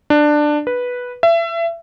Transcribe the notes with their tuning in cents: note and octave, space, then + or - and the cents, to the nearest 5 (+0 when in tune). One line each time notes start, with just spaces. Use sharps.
D4 +15
B4 -5
E5 +30